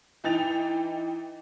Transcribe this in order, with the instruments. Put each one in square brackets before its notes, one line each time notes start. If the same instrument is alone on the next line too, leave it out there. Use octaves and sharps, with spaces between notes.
[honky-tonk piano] E3 D#4 G5 A6 F7